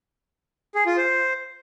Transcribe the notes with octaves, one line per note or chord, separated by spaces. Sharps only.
G#4
F4
C5